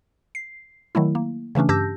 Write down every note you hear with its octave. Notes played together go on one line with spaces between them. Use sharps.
C7
D#3 F#3 A3 E4
A#3
C#3 E3 A3 C#4 D4
G2 G4 A5 E6 G6 A#6